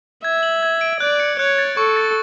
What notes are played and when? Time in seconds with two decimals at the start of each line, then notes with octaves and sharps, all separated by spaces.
0.24 E5 G#6
0.43 F#7
0.63 G#6
0.81 D7
1.00 D5 F#6
1.20 C#7
1.39 C#5 F#6
1.58 A6
1.77 A4 C#6
1.97 A6